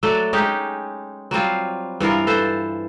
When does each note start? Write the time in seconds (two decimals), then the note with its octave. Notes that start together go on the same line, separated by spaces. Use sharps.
0.03 F#3 A3 D4 A4
0.33 G#3 C#4 D#4 G4
1.31 F#3 G3 C4 F4
2.00 G2 E3 F4 A#4
2.27 A4 B4 C5